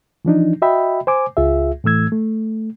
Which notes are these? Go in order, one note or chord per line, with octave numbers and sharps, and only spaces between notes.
E3 F3 D4 D#4
F#4 D#5 E5 G5 B5
C5 G#5 D6
C#2 F4 G#4 E5
A2 E3 A3 E6 G#6
A3